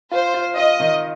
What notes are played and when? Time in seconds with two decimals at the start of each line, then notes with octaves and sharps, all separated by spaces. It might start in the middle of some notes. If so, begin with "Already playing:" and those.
0.11 F4 C5
0.34 F4
0.57 F4 D#5
0.80 D#3